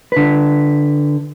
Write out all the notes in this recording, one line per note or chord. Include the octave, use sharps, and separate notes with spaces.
D3 B4